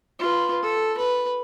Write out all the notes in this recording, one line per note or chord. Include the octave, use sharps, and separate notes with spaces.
F4 B4
A4
B4